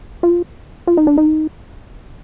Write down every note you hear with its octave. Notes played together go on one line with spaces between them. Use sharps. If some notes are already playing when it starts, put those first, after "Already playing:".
F4
F4
D#4
D4
D#4